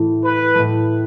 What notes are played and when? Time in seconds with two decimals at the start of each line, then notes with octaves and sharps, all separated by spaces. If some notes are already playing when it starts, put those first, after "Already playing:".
Already playing: A2 E3 A3
0.24 B4
0.54 A2 E3 A3